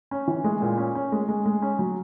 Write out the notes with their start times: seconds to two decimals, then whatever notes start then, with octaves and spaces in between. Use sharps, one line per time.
0.11 C#4
0.28 E3
0.44 G#3
0.62 A#2
0.78 C#4
0.95 C#4
1.12 G#3
1.29 G#3
1.46 G#3
1.62 C#4
1.79 F#3